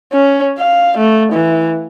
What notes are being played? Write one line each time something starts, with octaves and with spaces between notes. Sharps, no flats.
C#4
F5
A3
E3